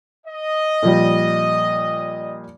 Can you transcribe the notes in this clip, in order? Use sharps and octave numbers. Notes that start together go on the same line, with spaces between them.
D#5
A#2 F3 G3